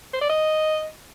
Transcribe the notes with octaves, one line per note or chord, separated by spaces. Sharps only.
C5
D5
D#5